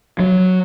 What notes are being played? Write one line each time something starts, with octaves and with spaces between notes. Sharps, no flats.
F#3